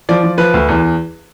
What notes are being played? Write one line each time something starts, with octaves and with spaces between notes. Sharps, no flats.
F3 D5
F3
F3 B4
D2
E2